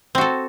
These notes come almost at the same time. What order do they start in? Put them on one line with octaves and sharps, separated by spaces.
C4 F#4 A4